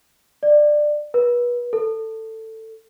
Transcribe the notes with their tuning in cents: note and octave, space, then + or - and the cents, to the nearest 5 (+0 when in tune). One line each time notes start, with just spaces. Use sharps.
D5 +15
B4 -30
A4 +15